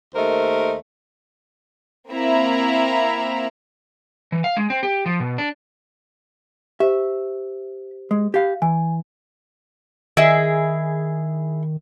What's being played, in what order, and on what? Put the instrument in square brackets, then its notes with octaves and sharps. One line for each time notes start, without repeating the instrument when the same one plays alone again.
[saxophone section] D#2 A3 A#4 C5 D#5
[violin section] A#3 C4 E4 E5 A#5
[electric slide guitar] E3
F5
G#3
C4
G4
F3
B2
D4
[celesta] G4 C5 [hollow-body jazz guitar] E5
[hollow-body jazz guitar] G#3
G4 F5
[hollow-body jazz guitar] E3 [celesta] G#5
[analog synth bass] D#3 [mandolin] E4 G#4 [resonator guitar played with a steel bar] D#5 E5